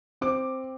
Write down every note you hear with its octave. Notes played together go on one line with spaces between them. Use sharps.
C4 D6